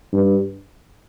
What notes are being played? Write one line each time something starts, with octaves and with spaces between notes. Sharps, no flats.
G2